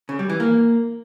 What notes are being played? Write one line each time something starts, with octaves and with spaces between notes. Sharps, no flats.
C#3
G3
E3
A#3